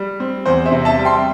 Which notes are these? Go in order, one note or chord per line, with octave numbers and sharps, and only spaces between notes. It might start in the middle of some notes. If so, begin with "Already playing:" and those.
Already playing: G3
C4
E2 C5
C5 E5
C3
E5 A5
G3
G5 C6